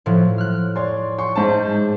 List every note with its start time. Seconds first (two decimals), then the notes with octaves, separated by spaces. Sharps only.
0.06 A2 F3 F#3
0.38 F6 F#6
0.76 C#5 D5 C6
1.18 C6 C#6
1.36 G#2 C5 A5